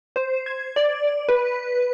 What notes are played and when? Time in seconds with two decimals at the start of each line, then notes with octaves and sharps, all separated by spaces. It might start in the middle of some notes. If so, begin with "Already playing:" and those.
0.16 C5
0.46 G#6
0.76 D5
1.29 B4